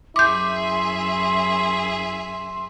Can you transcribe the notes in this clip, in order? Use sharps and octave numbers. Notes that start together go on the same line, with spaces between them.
F#2 E4 G#4 E5 C6 D6 G6